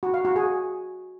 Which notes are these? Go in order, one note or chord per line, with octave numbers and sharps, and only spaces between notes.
F#4
F5
F#4
G#4